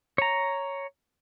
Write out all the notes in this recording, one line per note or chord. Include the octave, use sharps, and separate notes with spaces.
C#5 A#5